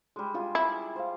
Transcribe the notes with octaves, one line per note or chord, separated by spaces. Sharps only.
G3 G#3
G3 F4 G#4
E4
C5 F5